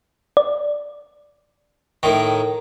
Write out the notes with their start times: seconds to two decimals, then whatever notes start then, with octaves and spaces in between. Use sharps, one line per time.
0.37 D5
2.03 A2 D#3